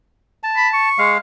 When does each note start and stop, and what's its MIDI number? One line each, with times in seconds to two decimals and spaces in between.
0.43 0.89 81
0.56 0.68 83
0.74 1.12 85
0.98 1.18 56
0.98 1.18 77